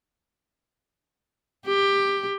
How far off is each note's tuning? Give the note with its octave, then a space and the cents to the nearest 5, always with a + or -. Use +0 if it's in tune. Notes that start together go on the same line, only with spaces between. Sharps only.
G4 +15